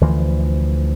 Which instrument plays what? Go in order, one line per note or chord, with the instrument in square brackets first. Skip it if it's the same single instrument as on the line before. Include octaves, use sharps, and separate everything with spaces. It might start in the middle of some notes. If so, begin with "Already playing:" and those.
[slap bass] D2 E3 F3